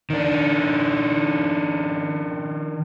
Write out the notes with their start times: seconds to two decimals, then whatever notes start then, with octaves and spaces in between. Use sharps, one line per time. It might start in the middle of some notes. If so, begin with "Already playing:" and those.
0.10 D#3 D4